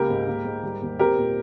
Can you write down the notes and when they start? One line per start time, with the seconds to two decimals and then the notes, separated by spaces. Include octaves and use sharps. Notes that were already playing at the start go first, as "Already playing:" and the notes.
Already playing: C#2 A#3 G4 A#4
0.09 G#2
0.27 A#3
0.45 G#2
0.63 G3
0.81 D#2
0.99 C4 G4 A#4
1.17 A#2